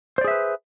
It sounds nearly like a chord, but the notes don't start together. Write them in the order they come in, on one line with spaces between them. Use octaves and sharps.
C5 D5 G#4 E5 B4